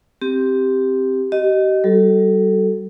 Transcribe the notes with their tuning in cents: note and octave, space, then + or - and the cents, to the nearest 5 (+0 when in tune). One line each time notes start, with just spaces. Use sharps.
C4 +0 G4 +0
G4 -40 D#5 +0
G3 -35 F#4 +25 A4 +0